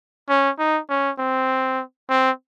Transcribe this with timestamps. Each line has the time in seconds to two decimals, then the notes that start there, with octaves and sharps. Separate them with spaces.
0.29 C#4
0.59 D#4
0.90 C#4
1.19 C4
2.10 C4